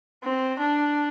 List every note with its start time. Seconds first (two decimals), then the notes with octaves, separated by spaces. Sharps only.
0.23 C4
0.59 D4